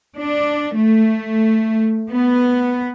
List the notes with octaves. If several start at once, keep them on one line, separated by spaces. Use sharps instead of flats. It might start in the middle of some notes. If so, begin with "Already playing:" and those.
D4
A3
B3